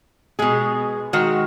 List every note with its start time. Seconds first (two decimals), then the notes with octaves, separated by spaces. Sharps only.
0.39 B2 G#3 G#4
1.13 D#3 G#3 F#4